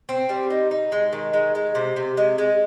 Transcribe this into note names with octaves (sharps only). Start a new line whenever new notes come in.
C4
G3
D#4
D#4
G#3
D#3
G#3
G#3
C3
C3
G#3
G#3